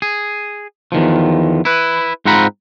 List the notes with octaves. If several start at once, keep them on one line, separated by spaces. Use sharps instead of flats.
G#4
E2 D#3 F3
E4 B4
G#2 C4 F4 F#5 A#5 B5